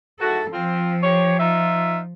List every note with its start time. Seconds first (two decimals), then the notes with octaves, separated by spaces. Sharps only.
0.20 G#2 E4 F#4 A4
0.52 F3 C4 F4
1.03 G4 C#5
1.38 D#4 F4 E5